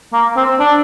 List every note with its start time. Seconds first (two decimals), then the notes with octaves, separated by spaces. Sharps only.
0.13 A#3
0.37 C4
0.60 D4